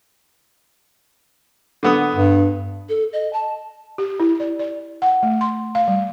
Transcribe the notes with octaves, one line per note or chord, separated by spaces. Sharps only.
D3 B3 D#6
G2
A4
D#5
A5
G4
E4
D5
D5
F#5
A3
C6
F5
G3